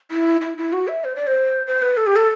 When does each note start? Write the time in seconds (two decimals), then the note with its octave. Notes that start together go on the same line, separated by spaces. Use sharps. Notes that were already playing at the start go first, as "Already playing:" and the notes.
0.11 E4
0.41 E4
0.58 E4
0.73 F#4
0.88 E5
1.04 C5
1.16 D5
1.27 C5
1.67 C5
1.82 B4
1.97 A4
2.07 G4
2.16 A4